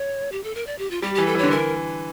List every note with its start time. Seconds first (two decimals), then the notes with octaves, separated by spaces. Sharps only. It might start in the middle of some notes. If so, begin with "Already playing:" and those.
Already playing: C#5
0.32 G4
0.44 A4
0.55 A#4
0.67 D5
0.78 G4
0.91 F4
1.02 G3 G4
1.15 E3 G4
1.26 A4
1.35 E3 C#5
1.43 D3
1.51 E3 A#4